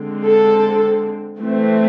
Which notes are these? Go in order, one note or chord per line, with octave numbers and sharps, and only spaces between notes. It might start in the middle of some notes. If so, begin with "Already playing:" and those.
Already playing: D3 G#3 C4
A4
E3 A3 C4